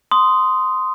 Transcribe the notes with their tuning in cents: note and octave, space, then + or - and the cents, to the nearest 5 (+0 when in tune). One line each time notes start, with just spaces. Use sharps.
C6 -10 D#6 +0